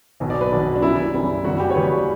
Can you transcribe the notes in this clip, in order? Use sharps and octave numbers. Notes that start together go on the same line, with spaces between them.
B1 B2 F#3
D5
B4
B1 B2 F#3
D4
F#1 F#2 E3 G3 E4
F#1 F#2 E3 G3
F#1 E2 C#3 G3 F#4
G4
C#5
F#1 E2 C#3 G3 B4